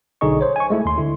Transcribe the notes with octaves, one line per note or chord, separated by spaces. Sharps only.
B1 D3 D#4 G#4 D#5 C#6
C5 C#5
G#5 C#6
G#3 A3 E4
D#2 C6
D3 E4